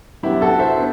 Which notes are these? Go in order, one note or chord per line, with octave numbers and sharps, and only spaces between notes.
F#2 F#3 B3 D4 E4 G4
F#4 A4
C5 E5
B3 D4